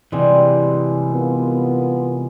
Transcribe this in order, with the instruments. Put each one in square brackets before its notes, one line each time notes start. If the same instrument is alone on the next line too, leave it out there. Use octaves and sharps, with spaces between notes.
[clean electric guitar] C3 E3 [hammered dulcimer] G3 G#3 E4
[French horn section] B3 F4 A#4